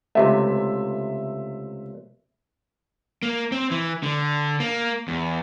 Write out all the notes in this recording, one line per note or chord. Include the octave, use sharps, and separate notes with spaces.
C#2 C3 A3 E5
A#3
C4
E3
D3
A#3
E2